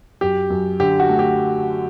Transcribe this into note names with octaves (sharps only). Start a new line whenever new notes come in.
F#2 G4
F#2
D3 G4
F#4
A3
G4